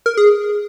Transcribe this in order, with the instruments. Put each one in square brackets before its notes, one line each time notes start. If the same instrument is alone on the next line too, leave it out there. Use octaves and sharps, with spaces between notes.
[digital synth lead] A#4
G#4